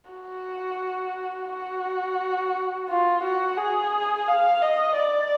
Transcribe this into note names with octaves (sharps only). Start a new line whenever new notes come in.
F#4
F#4
F4
F#4
G#4
F5
D#5
D5